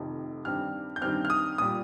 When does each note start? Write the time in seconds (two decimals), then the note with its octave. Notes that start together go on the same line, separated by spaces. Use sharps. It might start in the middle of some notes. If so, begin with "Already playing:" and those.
Already playing: F1 F2 C3 D#3
0.45 G2 D#3 G3 C4 F6
0.96 G6
1.01 G2 D#3 G3 C4 F6
1.25 F6
1.30 D#6
1.58 A#2 G3 D#6